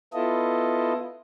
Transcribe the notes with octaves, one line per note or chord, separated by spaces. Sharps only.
B3 E4 F4 A4 D#5